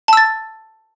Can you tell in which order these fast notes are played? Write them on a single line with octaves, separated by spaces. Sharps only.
A5 E6 A6